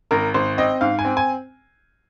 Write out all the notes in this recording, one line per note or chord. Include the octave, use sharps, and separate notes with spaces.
G#1 A#4
G#1 C5
C4 D#5
G#2 F5
G#5
C4
G#5